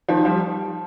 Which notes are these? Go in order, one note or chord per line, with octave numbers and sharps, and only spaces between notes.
D#3 F3
F3 G3